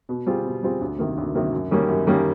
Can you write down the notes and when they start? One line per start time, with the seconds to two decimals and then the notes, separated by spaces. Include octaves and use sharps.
0.09 B2
0.26 G3 C4 F4 G#4
0.46 B2
0.63 G3 C4 F4 G#4
0.80 D2
0.99 C3 D#3 F#3 A#3
1.17 D2
1.35 C3 D#3 F#3 A#3
1.53 F#2
1.71 D#3 G3 A#3 C#4
1.89 F#2
2.07 D#3 G3 A#3 C#4